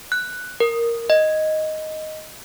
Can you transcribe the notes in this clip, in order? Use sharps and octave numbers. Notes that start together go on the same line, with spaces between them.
F#6
A#4
D#5